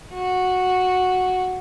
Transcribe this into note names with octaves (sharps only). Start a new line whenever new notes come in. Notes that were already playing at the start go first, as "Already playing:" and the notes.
F#4